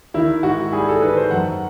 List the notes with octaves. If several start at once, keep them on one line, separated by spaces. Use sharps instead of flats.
D#3 E4
G#2 F#4
G3 G#4
A4
D#3 B4
C5
F#2 F#5